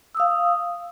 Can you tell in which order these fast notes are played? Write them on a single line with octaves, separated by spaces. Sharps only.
E6 D#6 F5